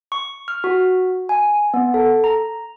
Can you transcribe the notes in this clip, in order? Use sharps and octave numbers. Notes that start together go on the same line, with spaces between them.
C#6
F6
F#4
G#5
B3
A4
A#5